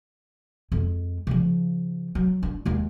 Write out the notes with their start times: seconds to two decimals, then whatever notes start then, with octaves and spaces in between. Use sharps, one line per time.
0.72 F2 G#3
1.27 C#3 F3
2.15 F#3
2.43 D4
2.65 D#2 G#3